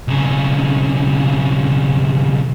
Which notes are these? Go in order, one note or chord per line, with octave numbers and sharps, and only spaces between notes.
B1 C#3